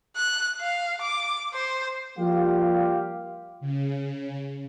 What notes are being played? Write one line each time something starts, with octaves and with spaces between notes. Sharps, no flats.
F#6
F5
D6
C5
F3 G3 A#3 F4 G4 F5
C#3